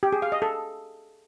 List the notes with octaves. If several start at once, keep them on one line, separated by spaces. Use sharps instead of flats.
G4
G#4
F5
D#5
A4